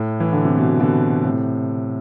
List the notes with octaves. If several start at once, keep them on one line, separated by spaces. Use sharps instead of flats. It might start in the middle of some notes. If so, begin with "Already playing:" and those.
Already playing: A2
E3
D3
C3
B2
B2 D3
A2 C3